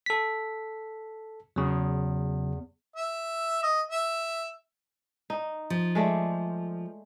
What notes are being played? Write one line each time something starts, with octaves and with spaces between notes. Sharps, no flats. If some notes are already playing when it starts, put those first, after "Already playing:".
A4 B6
E2 C#3 F#3
E5
D#5
E5
D#4
F3
G#3 A3 D5